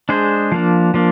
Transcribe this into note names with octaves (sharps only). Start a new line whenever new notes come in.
G#3 D4 G#4 C5
F3 A#3 D4
F3 A#3 D4